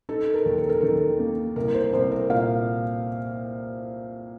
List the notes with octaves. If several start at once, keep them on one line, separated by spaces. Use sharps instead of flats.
D#4 A4
A#4
D#2
A4
A#4
D#3 A4
A#3
C2 A#4
C5
C2 C5
A#4
A#2 F5